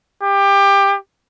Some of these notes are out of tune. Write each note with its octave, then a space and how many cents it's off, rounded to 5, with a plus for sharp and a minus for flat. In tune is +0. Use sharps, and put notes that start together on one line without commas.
G4 +20